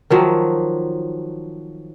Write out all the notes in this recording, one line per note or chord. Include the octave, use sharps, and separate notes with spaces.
D#3 F3 F#3